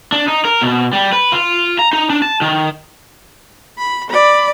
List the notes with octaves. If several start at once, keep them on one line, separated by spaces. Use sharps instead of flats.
D4
D#4
A#4
B2
G3
B4
F4
A#5
D#4
D4
A5
D#3
B5
D5 B5